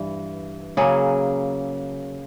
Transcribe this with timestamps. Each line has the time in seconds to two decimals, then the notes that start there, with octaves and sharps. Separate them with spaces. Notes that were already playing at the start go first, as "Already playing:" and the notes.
Already playing: G2 E3
0.77 C#3 F#3 A#3 G#4